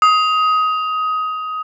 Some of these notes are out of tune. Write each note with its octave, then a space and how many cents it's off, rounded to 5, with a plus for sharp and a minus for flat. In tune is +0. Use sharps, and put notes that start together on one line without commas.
D#6 +20